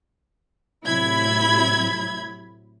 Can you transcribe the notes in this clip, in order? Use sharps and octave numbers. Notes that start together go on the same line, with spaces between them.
A2 C3 F#3 E4 B5 G#6